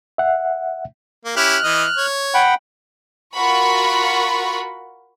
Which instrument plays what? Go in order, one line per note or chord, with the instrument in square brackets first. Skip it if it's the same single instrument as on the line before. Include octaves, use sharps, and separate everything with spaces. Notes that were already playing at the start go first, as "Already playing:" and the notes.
[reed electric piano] E5 F#5
[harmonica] A#3
[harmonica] C#4 E4 G4 [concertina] F6 F#6
[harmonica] E3 D#5
C#5
[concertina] F#5 G5 B5
[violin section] F4 F#4 A#4 F#5 B5 C#6